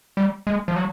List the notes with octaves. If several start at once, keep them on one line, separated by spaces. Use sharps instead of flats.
G3
G#3
F3
F#3